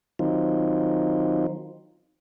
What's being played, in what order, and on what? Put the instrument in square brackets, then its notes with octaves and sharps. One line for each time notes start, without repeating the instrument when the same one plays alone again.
[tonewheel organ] D#3 F#3 C4 D#4 F4